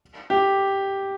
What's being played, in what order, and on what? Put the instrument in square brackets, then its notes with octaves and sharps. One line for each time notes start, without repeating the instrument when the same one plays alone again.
[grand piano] G4